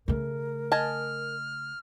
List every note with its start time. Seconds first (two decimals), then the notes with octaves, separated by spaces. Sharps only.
0.08 C#3 A3 A#4
0.72 D#5 G#5 A5 F6